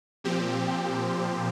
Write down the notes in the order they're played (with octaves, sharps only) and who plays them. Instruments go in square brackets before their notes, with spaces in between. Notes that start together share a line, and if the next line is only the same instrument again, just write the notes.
[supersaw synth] A#2 F3 C4 G4